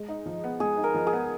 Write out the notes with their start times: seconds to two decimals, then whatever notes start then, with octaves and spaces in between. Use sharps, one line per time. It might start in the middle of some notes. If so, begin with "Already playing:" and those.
Already playing: G#3
0.09 D#4
0.26 F3
0.44 B3
0.60 G#3 G#4
0.77 D#4
0.84 A#4
0.94 F3
1.07 G#4
1.13 B3